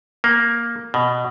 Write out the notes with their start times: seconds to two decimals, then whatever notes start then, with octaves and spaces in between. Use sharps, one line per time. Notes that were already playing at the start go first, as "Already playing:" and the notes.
0.24 A#3
0.94 B2